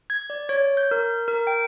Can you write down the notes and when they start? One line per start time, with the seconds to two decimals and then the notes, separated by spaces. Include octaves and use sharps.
0.10 G#6
0.30 D5
0.49 C#5
0.77 G6
0.91 A#4
1.28 A#4
1.47 G5